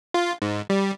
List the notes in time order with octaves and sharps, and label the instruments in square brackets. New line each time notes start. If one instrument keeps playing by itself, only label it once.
[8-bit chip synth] F4
G#2
G3